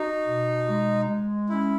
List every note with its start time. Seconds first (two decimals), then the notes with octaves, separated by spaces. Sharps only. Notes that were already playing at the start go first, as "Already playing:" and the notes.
Already playing: D#4 F#4
0.27 B2
0.68 G#3
1.09 G#3
1.49 C#4 E4